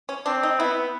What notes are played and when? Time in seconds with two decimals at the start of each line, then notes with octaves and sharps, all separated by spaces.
0.09 C#4
0.26 C4 D4
0.43 D#4
0.59 B3 E4